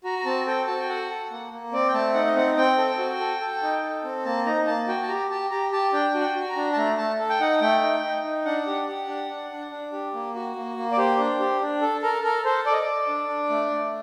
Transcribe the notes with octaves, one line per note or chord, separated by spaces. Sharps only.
F#4 A#5
A#5
C4 A5
A4 G5
F#4 A5
G5
A4 F#5
A4
A#3
A#3
C4 D5
G5
A3 A5
D#4 F#5
D#5
C4 F#5
C4 G5
A4
F#4
A4
A4
D#4
A4
C4
A#3 A5
D#4 A#5
A#3 A5
F#4 G5
A5
G4 A#5
G4 A5
G4 A#5
G4 A5
D4 G5
F#4
G5
F#4
A#5
D4
A5
A3 A#5
A3 A5
A4
G5
D#4 F#5
A3 G5
D#4
D#4
D#4
D4 F#5
G4
G4
D4
D4
D4
D4
G4
A#3
F#4
A#3
A#3
D5
G4 C5
D4
G4
D4
A4
A4 A#4
A4 A#4
A4 C5
A4 D5
D#5
D5
A4
D4
D4
A3
A3